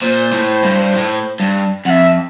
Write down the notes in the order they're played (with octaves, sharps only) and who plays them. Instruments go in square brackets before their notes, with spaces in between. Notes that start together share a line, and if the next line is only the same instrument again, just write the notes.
[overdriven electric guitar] A#2 [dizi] C5
[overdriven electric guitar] A2
G2
A2
G2
[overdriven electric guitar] F2 [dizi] F#5
[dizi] E5